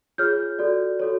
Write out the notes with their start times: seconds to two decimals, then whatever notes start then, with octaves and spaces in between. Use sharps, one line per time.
0.18 F4 G#4 C#5 F6 G6
0.59 F#4 A4 D5
0.99 F#4 A4 C#5